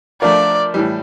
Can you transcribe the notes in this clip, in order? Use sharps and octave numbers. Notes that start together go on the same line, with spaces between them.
F3 A3 D4 F4 A#4 D5
A2 E3 G3